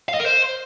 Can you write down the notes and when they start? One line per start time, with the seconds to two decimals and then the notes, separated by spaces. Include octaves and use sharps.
0.09 F5
0.14 D#5
0.20 A#4
0.26 C5